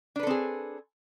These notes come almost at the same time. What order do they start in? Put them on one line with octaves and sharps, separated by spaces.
D4 B4 A4 C4 G#4